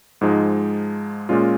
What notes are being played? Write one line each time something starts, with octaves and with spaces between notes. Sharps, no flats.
G#2 F3 G#3 D#4
A#2 G#3 C#4 F4